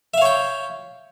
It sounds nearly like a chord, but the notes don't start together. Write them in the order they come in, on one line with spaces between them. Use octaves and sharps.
E5 F5 C#5 G5